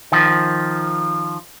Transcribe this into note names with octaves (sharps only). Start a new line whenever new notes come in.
D#3 F3